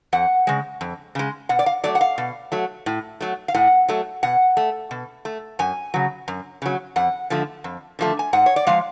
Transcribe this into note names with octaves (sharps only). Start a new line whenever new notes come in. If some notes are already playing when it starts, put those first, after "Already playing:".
F2 F#5
C#3 G#3
F2
C#3 G#3
B2 F#5
D5
F5
F#3 A3 D5
F#5
F5
B2
F#3 A3
A2
F#3 A3
F5
A2 F#5
F#3 A3
B2 F#5
A3
B2
A3
F#2 G#5
C#3 F#3
F#2
C#3 F#3
F2 F#5
D3 F3 A3
F2
D3 F3 A3
G#5
G#2 F#5
C#5
D5
F3 G#3 F5